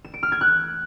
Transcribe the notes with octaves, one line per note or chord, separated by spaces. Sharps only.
E7
D7
F6
G#6
F#6